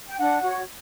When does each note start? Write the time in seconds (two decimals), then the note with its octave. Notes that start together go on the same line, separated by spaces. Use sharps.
0.09 G5
0.18 D4 F#5
0.42 F#4 C#5